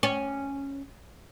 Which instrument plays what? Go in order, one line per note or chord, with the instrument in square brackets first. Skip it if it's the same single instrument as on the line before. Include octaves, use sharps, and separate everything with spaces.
[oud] C#4